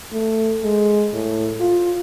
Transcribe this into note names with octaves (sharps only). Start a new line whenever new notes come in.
A3
G#3
A2
F4